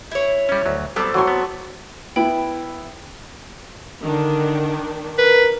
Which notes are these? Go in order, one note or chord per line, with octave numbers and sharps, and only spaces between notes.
E4 C#5
G3 C#4
D2 F#3
F#3 G3 B3 C4 A4 D5
A2 E3 F#3 C6 C#6
B3
B3 E4 G5 B5
D3 D#3 D4
A#4 B4